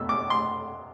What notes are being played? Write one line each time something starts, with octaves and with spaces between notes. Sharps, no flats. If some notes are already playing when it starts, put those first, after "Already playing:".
Already playing: B2 A3 E6
D6
C6